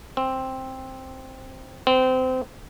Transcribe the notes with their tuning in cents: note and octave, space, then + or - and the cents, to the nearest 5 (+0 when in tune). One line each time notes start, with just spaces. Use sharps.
C4 +5
C4 -25